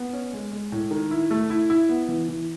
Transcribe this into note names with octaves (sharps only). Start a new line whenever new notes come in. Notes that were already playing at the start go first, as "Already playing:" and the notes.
Already playing: B3
C#4
G#3
G#3
A2
D#3
E4
A3
E4
E4
B3
E3
E3